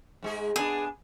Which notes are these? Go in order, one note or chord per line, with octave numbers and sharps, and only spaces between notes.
G#2 G#3 G#4
B3 D4 G#4